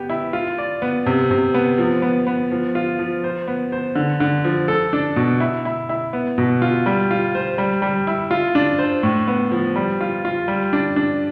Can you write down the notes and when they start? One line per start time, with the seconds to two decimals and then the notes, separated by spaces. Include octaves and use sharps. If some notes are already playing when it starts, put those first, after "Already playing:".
Already playing: B3 G4
0.10 E4
0.33 F4
0.58 D5
0.82 B3
1.06 C3
1.31 C3
1.54 B3
1.78 F3
2.02 B3
2.27 B3
2.51 F3
2.75 F4
2.99 F3
3.24 C5
3.48 B3
3.72 C5
3.95 D3
4.20 D3
4.44 F3
4.68 A4
4.93 D4
5.16 B2
5.40 E4
5.65 E4
5.89 E4
6.13 B3
6.38 B2
6.62 F4
6.86 G3
7.11 F4
7.35 C5
7.58 G3
7.82 G3
8.07 E4
8.31 F4
8.55 D4
8.79 C5
9.03 A2
9.28 B3
9.52 F3
9.76 G3
10.01 F4
10.25 F4
10.48 G3
10.73 D4
10.96 D4